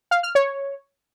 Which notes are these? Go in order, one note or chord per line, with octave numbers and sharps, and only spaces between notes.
F5
F6
C#5